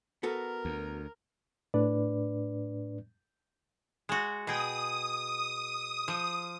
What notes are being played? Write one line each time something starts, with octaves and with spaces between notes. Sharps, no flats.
B3 F#4 A4 A#4
D2
A2 D4 B4 D5
G#3 F#4
B2 G#4 G5 D#6
F3